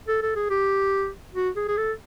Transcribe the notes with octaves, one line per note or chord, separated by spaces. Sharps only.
A4
A4
G#4
G4
F#4
G#4
G#4
A4